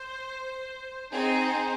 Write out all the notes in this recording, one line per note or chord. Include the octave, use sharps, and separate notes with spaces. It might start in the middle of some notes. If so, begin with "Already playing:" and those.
Already playing: C5
C4 D#4 G#4 C5